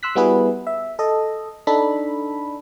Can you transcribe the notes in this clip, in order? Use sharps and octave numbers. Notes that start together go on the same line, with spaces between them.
C6 E6 F#6 B6
G3 B3 E4 F#4 G#4 B4
E5
A4 D#5
D4 D#4 A4 B5